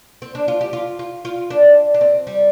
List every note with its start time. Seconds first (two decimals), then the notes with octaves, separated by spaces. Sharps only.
0.22 C4
0.35 D4
0.48 F4
0.61 G4
0.73 F4
0.99 F4
1.25 F4
1.50 D4
1.94 D4
2.01 C4
2.27 G3